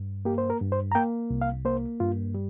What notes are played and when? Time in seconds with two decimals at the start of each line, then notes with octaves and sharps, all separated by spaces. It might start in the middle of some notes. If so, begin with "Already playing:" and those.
Already playing: G2
0.25 A#3 G4
0.38 C5
0.50 A#4
0.61 G2
0.72 C5
0.92 A#5
0.95 A#3 G5
1.30 C2
1.41 F5
1.65 A#3 C5
2.00 G2 F4
2.34 G3